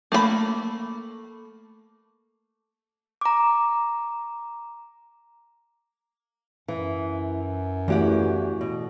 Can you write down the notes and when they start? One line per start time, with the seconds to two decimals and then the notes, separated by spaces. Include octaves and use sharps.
0.12 A3 A#3 A4 B5
3.21 A#5 D6
6.68 F#2 E3
7.88 E2 E3 A3 F#4 G4 F#5
8.61 B2